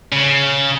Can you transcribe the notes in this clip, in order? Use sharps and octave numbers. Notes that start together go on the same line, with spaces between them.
C#3